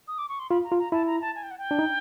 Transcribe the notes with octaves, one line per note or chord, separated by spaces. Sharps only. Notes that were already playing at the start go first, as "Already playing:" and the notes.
D#6
D6
C#6
C6
F4 B5
A#5
F4
A#5
E4 A5
A#5
A5
G#5
G5
F#5
G5
D4
D#4